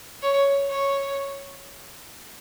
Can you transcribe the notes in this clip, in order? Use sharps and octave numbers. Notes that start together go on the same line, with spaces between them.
C#5
C#5